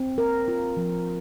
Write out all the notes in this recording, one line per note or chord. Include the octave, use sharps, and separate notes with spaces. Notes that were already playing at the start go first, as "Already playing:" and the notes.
Already playing: C4
A#4
F4
F3